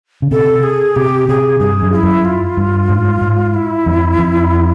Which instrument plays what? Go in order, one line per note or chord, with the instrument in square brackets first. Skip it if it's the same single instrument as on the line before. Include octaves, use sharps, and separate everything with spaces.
[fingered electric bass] C#3
[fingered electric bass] C3 [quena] A4
[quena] G#4
[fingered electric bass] C3 [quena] G4
[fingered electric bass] C3 [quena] G#4
[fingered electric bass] G2 [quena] G#4
[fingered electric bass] F#2
[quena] F4
E4
[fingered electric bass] F#2
[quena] F4
[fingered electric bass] G2
G#2
G#2
[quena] E4
[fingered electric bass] F2
F2